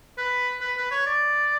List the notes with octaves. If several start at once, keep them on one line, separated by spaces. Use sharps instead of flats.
B4
B4
B4
C#5
D5